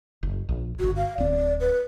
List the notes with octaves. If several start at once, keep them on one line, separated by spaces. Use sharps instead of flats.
F#1
A#1
D1 G1 F#4
F5
D1 C4 D5
B4